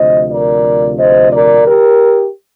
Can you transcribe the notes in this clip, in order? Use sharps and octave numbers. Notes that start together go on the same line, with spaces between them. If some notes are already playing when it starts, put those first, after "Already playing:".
Already playing: D2 C3 F3 C5 D#5
A#4 D5
C5 D#5
A#4 D5
G4 A#4